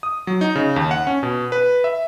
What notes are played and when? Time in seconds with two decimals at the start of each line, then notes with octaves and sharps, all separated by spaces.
0.03 D#6
0.27 F#3
0.41 D#4
0.55 C#3
0.76 D#2
0.91 F#5
1.07 C#4
1.23 B2
1.52 B4
1.84 E5